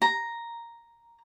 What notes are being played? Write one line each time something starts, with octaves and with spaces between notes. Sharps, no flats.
A#5